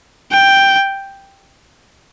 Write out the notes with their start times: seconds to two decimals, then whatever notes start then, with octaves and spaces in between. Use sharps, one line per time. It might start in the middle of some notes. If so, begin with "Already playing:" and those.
0.32 G5